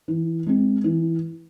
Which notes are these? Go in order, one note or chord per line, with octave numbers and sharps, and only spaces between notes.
E3
G#3 C4
E3